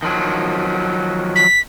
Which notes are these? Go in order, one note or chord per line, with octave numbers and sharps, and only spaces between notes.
D#3 F3 F#3
B6